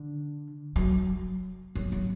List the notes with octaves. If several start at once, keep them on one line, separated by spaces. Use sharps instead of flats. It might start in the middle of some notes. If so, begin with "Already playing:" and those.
Already playing: D3
F#3
F#3
F#3